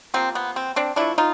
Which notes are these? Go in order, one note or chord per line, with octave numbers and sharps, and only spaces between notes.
C3 F3 A#3 C4
B3
C4
C4 D4
D3 F3 A3 D4 E4
D#4 F4